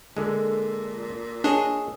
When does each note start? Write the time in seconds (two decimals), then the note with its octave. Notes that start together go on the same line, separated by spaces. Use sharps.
0.17 A#2 D3 G#3 A4
1.44 D4 G#4 C#5 D#5